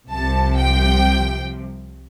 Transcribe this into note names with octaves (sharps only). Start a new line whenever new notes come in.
C2 C3 F3 A5
G5